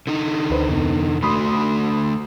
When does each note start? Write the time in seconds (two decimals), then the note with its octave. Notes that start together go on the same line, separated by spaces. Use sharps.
0.07 D3 D#4
0.50 D2 B4 C5
0.69 F2 C3 B3
1.23 D3 A3 F#4 B5 C6 D#6